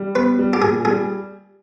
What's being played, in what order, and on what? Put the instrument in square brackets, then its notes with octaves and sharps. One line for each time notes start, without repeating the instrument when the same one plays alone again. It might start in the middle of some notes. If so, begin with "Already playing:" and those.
Already playing: [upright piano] G3
[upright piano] B3 [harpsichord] B4
[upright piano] G3
[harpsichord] G4
[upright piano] A#2 [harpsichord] G#4
[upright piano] G3 [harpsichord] G#4